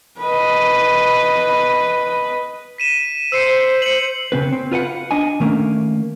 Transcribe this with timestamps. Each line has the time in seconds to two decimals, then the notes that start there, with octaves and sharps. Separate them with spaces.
0.19 B4 D#5
2.78 B6 D#7 E7
3.32 C5 E6 C7 C#7
3.82 C#7 F#7
4.32 C#3 C4 B4
4.53 C4
4.72 F4 B4 F5 F#5
5.11 D4 D#5 G#5
5.40 D#3 A3 A#3 C#4